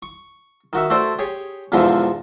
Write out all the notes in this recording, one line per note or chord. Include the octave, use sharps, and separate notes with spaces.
C#6
D#3 F#4 E5
A3 F#4 A4 C5 D5
G4 G#4 C#5
E2 G#2 B2 D3 E3 F3